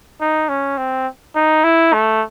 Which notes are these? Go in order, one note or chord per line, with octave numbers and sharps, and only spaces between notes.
D#4
C#4
C4
D#4
E4
A3